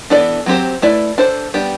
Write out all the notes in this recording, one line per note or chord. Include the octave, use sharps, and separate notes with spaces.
E3 B3 D4 A4 D5
F#3 C4 G4 C5
A3 E4 B4 D5
D4 A4 C5
G3 B3 D4 G4